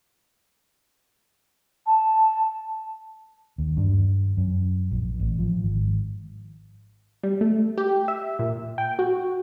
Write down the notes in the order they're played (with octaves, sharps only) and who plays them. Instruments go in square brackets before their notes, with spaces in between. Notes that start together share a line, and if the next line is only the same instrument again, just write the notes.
[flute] A5
[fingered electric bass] D#2
G2
F#2
A#1
A1
F3
G#1
[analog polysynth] G3
A3
G4
E5
A#2
G5
F#4